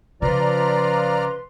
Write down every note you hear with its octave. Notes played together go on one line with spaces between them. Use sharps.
C#3 F3 B4 D5 A#5 C6 F6